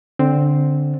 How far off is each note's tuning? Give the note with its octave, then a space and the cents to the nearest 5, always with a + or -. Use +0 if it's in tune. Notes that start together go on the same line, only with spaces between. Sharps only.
D3 -5 C4 +0